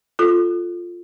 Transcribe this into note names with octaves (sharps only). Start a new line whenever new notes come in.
F4 A4